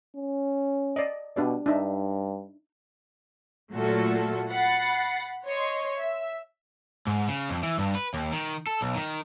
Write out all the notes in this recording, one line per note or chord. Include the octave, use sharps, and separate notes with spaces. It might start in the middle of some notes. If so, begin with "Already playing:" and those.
C#4
D5 D#5
B2 D4 G4 D5
G2 D4 D#4 E5
A#2 F#3 A3 F4 F#4 A4
F#5 B5 A6 C7
C#5 D#5 C6 C#6
E5
G#2
C#3
F2
E3
G2
B4
D#2
D#3
A4
B1
D#3